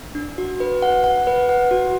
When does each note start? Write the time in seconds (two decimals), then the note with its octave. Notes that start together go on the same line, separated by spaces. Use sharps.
0.15 D4
0.38 F#4
0.60 B4
0.82 F#5
1.04 F#5
1.27 B4
1.49 F#5
1.71 F#4